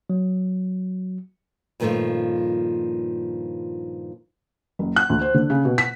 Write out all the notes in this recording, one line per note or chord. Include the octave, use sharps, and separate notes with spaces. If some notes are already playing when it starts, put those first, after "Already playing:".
F#3
G2 A#2 D#3 F3 A3 F4
F#1
F#6
D2
C5
D3
C#3
B2
B6